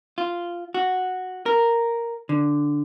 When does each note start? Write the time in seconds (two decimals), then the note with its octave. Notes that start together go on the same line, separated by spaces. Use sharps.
0.18 F4
0.74 F#4
1.46 A#4
2.29 D3